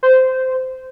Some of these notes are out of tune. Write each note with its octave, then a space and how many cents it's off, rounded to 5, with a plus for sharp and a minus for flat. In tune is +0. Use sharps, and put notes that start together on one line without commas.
C5 -15